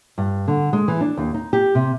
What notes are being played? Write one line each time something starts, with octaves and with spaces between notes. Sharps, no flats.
G2
D3
G#3
E3
D4
D#2
D#4
G4
C3